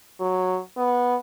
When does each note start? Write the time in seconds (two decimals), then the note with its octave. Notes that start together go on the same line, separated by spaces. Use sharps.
0.20 F#3
0.77 B3